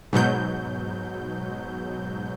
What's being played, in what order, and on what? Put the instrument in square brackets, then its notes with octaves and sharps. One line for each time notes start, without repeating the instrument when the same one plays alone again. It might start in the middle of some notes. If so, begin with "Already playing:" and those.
[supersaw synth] G#2 B2 F#3 G6